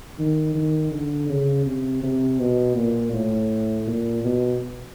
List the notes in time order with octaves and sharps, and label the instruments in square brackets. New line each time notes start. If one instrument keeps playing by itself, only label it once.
[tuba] D#3
D#3
D3
C#3
C3
C3
B2
A#2
A2
A#2
B2